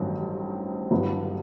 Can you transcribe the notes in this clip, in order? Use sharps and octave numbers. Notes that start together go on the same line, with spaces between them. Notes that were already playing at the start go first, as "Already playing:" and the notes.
Already playing: A1 G2 D#3 F#3 C4
G1 G2 F#3 B3 E4